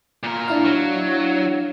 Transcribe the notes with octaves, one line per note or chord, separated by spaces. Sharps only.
A#2 A#4
D4 E4 F5
F#3